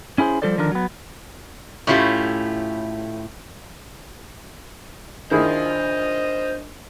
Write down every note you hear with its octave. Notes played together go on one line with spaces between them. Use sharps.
C#4 E4 G#4 C5
F3 G3 F#4 A4 C5 D5
D3 D#3 F3 D4 A#4
F#3 B3
A2 A3 C#4 E4 F4 G4
D#3 D4 E4 G#4 C5 D#5 F5